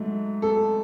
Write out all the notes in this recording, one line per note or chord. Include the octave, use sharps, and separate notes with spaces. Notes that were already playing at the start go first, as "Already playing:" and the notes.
Already playing: G#2 F#3 A3
A4